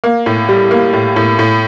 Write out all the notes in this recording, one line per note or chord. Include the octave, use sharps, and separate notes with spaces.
A#3
A2
G3
A#3
A2
A2
A2